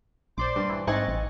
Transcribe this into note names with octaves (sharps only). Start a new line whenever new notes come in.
A#1 C5 D5 C6 D6
G2
E3
G#2 C4 D#4 D#5 G#5 C#6 F#6 A6
A1